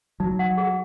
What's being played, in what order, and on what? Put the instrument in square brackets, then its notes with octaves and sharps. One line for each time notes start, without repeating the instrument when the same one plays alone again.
[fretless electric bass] F#3 [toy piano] D#4
[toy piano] F#5
G#4